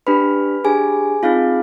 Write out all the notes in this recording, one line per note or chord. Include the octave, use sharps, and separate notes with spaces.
D4 G4 B4 B5
D4 G4 G#4 G#5
C4 D#4 F4 G#4 F5